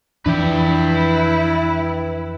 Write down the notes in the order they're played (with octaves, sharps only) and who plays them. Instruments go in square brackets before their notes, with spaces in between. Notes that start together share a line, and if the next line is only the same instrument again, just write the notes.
[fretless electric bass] F2 E3 F3 [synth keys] D4 [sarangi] E4 [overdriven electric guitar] B4 G5